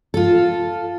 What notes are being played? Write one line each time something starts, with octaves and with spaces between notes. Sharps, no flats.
F4 A4